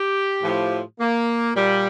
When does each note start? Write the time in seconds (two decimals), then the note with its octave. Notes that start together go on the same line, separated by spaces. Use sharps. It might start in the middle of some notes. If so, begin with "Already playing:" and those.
Already playing: G4
0.43 A2 F3
1.00 A#3
1.56 A#2 G3